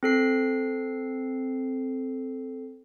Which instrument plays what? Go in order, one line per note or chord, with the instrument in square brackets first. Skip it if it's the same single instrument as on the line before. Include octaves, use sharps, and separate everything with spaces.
[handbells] C4 A4 C7